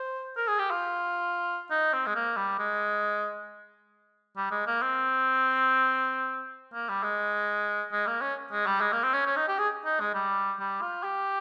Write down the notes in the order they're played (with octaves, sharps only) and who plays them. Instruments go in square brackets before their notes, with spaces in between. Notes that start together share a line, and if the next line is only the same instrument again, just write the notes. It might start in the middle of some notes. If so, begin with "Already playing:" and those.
Already playing: [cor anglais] C5
A#4
G#4
G4
F4
D#4
C4
G#3
A#3
G3
G#3
G3
G#3
A#3
C4
A#3
G3
G#3
G#3
A#3
C#4
G#3
G3
G#3
A#3
C4
C#4
C#4
D#4
G4
G#4
D#4
G#3
G3
G3
F4
G4